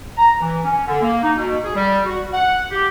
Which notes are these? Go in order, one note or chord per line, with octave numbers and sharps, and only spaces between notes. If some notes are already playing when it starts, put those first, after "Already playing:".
A#5
E3
C#4
D3
A#3
D#4
B2
G#4
G3
F#4
F#5
G4